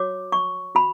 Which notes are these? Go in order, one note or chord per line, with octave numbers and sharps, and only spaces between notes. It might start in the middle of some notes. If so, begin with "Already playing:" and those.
Already playing: F#4 C#5 D6
C#6
F#4 B5